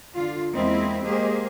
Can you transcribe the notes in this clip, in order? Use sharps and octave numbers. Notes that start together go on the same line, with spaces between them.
D3 F4
E2 G#3 A#3 C4 E4 D#5
G#3 A#3 G4 G#4 C5 D#5